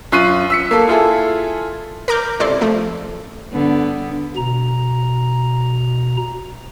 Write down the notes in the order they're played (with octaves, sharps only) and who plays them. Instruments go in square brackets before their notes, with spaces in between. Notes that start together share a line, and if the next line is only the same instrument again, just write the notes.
[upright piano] F#2 F4 C#6 F#6 C7 D#7
E6 B6 C#7
A#3 A4
E4 F4 G#4 A4
[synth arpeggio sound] A#4 A#5 D6 F6 G6
C#2 C3 E4 A4 D5 C6
F3 A3
[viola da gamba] G2 D3 B3
[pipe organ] B2 A#5